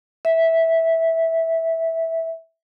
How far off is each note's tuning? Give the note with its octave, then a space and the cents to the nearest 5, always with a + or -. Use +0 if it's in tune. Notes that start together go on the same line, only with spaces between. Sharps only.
E5 -10